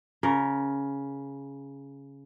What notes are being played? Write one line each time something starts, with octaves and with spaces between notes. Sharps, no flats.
C#3 A#4